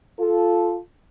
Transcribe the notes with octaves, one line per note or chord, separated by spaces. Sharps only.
F4 A4